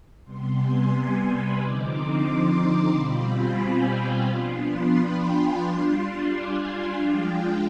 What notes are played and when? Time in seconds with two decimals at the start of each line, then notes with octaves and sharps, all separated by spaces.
0.24 C3 G3 B3 C6
0.58 G#5
0.92 C6
1.25 B5
1.58 D3 F3 C4 D#4 D6
1.92 C6
2.26 D6
2.59 C6
2.93 B2 G3 C4 F4 B5
3.26 G#5
3.60 G5
3.93 G5
4.27 F3 B3 D4 F4 C6
4.60 B5
4.94 G5
5.27 G#5
5.61 G3 D4 F4 C6
6.28 G#5
6.94 F3 G#3 D4 F4 G5